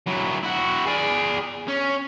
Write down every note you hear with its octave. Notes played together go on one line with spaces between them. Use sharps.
F#3 E4
E4 F#4
G#4 D5
C#4